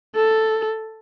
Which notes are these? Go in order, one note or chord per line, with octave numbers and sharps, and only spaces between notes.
A4